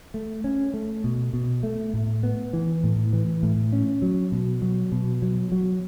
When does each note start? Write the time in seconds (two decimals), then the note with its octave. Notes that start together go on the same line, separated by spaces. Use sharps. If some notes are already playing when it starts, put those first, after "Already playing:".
0.14 A3
0.44 C#4
0.74 A3
1.04 B2
1.33 B2
1.63 A3
1.94 A2
2.23 B3
2.53 E3
2.84 A2
3.13 E3
3.43 A2
3.72 C#4
4.02 F#3
4.32 B2
4.62 F#3
4.92 B2
5.22 F#3
5.52 F#3